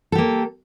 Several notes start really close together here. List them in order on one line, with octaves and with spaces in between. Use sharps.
A4 G4 A#3